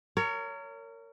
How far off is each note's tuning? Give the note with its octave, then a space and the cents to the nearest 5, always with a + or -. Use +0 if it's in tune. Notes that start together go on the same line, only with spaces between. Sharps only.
A#4 -25 C#5 +20